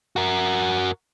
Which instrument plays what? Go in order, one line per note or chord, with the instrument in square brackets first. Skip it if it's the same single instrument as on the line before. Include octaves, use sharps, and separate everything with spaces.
[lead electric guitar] F#4 A#4